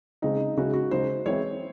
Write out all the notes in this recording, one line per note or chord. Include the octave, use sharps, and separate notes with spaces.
C#3 G#3 C4 D#4
C#3 G#3 C#4 E4 F#4
F#4
C#3 G#3 D#4 C5
E3 G#3 C4 E4 C#5